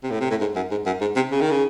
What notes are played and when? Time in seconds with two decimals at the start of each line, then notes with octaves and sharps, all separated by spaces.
0.03 C3
0.10 A2
0.20 C3
0.30 A2
0.41 G#2
0.56 F#2
0.71 G#2
0.86 F#2
1.01 G#2
1.16 C3
1.31 C#3
1.41 D#3
1.51 C#3